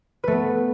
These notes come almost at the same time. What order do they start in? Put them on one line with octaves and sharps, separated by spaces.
B4 A3 B3